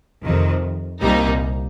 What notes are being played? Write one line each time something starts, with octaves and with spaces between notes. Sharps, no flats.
F2 C3 D#3
C2 A#2 G3 A#3 D#4